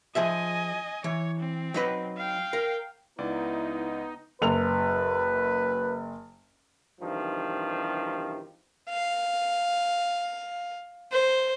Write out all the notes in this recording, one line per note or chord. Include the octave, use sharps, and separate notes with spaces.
F3 G#4 D#5 E5 G#5
E3 C#5
C4
F#3 D#4 B4
F5 G5
A#4
C#2 B3 D#4 E4 D5
F#1 F#2 B4 F7
E2 G2 C3 D#3 F3
F5
C5